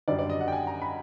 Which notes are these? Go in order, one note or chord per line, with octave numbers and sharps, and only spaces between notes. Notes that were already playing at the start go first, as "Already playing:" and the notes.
F#2 D3 G3 D5
D5
D#5
F#5
G5
G#5
A#5
B5